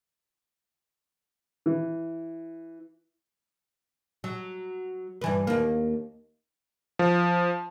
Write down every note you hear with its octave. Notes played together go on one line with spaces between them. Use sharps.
E3
F#3
G2 E3 B4
D#2 A#3
F3